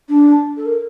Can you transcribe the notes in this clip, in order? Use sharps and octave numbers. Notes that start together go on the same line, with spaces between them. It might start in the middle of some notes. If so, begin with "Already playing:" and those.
D4
A4
A#4